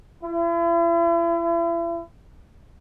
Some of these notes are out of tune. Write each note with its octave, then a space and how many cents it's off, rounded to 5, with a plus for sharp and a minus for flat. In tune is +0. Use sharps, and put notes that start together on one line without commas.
E4 +40